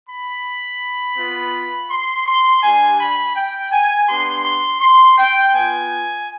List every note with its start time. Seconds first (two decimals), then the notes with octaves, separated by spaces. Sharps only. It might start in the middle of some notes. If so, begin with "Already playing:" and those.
0.09 B5
1.18 B3 F4
1.90 C6
2.26 C6
2.63 G3 D4 G4 G#5
3.00 B5
3.36 G5
3.72 G#5
4.09 B3 D4 G4 C6
4.44 C6
4.81 C6
5.18 G5
5.53 B3 F4 G#5